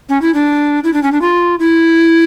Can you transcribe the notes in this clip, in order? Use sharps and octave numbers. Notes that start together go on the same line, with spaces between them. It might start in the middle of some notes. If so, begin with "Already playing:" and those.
C#4
E4
D4
E4
D4
C#4
D4
F4
E4